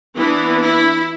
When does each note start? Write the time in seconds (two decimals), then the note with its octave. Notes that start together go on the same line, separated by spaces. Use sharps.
0.15 E3 B3 D4 E4
0.61 E4